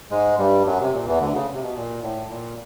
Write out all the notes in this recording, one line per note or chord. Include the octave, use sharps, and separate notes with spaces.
G#2 G#3
G2 G3
F#2 F#3
C3
A#2
E2 E3
D2 D3
C#3
C3
B2
A#2
A2
A#2